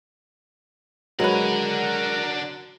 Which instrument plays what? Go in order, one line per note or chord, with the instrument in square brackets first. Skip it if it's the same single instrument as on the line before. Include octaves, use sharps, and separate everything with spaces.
[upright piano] F#3 [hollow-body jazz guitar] G#3 B4 [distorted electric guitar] D4 F#5 [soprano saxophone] A#4